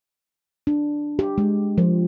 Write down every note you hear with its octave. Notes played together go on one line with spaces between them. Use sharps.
D4
G4
G#3
F3